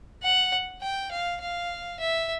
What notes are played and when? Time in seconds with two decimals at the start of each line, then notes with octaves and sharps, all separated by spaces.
0.23 F#5
0.81 G5
1.11 F5
1.41 F5
1.99 E5